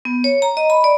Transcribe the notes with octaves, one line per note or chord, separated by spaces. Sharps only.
B3
C#5
A#5
D#5
B5
D5